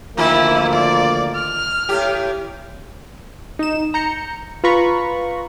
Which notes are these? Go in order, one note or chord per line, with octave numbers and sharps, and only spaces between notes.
D2 D#3 F3 A#3 E4 F4 A#4
D5
F6
A2 G4
D#4 E7
A#5 G6 C#7
F4 B4 A#5 B5 C#6